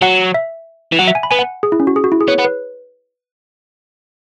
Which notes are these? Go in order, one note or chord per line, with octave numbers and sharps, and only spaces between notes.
F#3 F#5
E5
E3
F#3 F#5
E5
G#5
B5
B3 G#5
F#5
G#4
E4
C#4
F#4
G#4
F#4
E4
G#4
B3 C#5
B3
B4